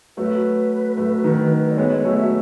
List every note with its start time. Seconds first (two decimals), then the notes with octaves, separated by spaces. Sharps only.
0.17 F#3 A3 B4
0.97 F#3 A3
1.24 D#3 F#3
1.71 D#5
1.77 G#3 B3 C#5
2.04 F#3 A3
2.17 E5